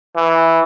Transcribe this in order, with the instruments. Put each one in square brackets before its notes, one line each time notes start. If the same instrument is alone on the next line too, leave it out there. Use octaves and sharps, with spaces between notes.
[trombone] E3